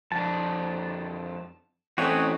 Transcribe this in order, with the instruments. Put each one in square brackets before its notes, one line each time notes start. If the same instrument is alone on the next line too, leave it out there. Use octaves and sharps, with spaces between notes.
[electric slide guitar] F2 D4 [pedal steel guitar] A5
[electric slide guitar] E3 A3 [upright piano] C4 C#4 A4 [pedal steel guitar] F#4 C#5 D#5